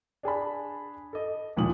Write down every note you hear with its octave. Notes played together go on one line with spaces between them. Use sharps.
D4 G#4 A5 B5
A4 D#5
A1 D#2 A#2 F3 D#6 F#7